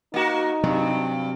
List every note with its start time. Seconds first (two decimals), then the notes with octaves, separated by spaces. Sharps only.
0.14 A#3 D#4 F#4
0.64 G2 C3 F#3